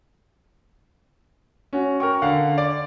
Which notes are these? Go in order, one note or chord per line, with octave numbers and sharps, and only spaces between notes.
C#4 F#4
A#4 G5 C#6
D3 F5 F#5
D5